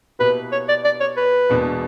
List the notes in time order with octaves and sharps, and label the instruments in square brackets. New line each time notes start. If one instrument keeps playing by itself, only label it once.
[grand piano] B2 A#3 E4 G4 [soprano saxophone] B4
[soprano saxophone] C#5
D5
D5
C#5
B4
[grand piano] E1 E2 B2 A#3 D4